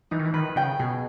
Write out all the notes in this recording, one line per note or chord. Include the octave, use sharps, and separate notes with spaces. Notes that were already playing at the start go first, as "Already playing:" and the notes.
E3 D#4
D#3
E3
D#3 B4
C#3 G5
B2 G#4